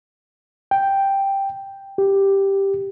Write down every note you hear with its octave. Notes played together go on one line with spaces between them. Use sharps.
G5
G4